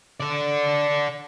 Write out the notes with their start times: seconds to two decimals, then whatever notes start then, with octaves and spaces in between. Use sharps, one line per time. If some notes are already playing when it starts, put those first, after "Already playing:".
0.20 A4 D5